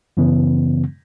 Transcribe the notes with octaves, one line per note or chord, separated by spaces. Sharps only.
F#2 C#3 E3 B3